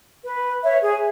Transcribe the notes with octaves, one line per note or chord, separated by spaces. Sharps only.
B4
C#5 E5
G#4